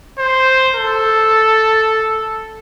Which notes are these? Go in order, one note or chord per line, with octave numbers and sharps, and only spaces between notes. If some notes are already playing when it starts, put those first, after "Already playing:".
C5
A4